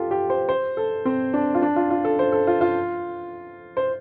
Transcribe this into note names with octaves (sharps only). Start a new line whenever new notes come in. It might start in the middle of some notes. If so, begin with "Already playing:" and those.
Already playing: F4 G4 A4
G4
C5
C5
A4
C4
D4
F4
D4
F4
F4
A4
C5
A4
F4
F4
C5